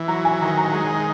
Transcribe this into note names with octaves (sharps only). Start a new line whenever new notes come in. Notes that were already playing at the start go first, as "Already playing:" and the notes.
Already playing: E3
F#3 A#5
G#5
D#3 A#5
A#5
G#5
G#3 A#5